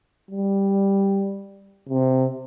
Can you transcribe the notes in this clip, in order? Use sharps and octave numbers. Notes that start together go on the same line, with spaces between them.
G3
C3